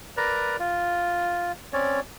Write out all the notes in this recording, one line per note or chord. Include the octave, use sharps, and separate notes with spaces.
A#4 B4 D5 A#5
F4
C4 C#4 C#5 D5